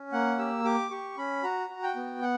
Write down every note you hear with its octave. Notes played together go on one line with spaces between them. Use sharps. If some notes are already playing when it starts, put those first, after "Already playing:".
Already playing: C#4
A#3 F#5
G4 E6
G4 D6
G4 C#6
C#4 B5
F#4 A#5
F#4
G5
B3
F#5